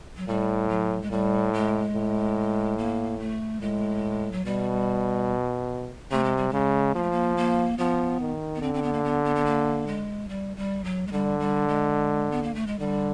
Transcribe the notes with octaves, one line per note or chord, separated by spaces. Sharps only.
F#3
A2 G3
F#3
G#3
A2 G3
G#3
A2
A#3
A3
A2 G#3
F#3
B2 G3
C3 A3
G#3
G3
C#3 G#3
F3 A#3
A3
A#3
A#3
F3 B3
D#3
B3
D3 C4
C4
B3
A#3
B3
B3
B3
A#3
G#3
G3
G3
F#3
G#3
D3 G3
G3
G#3
B3
A#3
A3
G#3
D3 G3